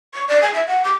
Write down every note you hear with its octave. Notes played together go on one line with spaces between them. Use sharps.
C#6
D5
G#5
E5
F#5
D6